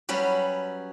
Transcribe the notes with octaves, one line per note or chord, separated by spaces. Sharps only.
F#3 G3 C#4 B4